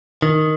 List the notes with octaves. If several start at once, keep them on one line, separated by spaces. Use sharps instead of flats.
D#3